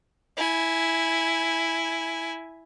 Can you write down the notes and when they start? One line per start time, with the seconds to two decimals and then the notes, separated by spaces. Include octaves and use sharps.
0.37 E4 G#5